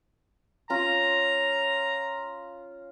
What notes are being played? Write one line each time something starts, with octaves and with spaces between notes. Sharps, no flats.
C#4 F4 A#5